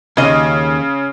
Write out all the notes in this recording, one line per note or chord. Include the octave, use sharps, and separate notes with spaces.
D#2 C#3 D#5